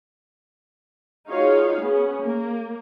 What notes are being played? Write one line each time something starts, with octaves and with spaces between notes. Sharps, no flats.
D#4 F4 F#4 G#4 C#5 F5
B3 C#4 G#4
A#3